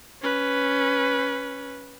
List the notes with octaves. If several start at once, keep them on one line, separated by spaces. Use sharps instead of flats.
C#4 B4